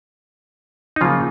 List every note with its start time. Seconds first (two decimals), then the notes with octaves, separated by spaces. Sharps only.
0.96 D#4
1.01 C#3 F3 F#3 A#3 F4